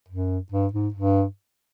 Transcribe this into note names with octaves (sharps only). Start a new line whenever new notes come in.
F#2
G2
G#2
G2